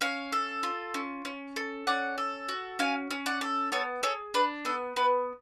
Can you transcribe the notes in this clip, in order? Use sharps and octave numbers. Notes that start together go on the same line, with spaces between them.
C#4 C#5 F5
A4
F4
C#4
C#4
A4
C#4 D5 F#5
A4
F#4
C#4 F5 G#5
C#4
D5 F#5
A4
B3 A4 C#5
G#4 A4 C#5
D4 B4
B3 A4
B3 B4